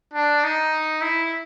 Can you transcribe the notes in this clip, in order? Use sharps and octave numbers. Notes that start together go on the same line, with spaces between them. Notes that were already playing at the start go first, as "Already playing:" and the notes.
D4
D#4
E4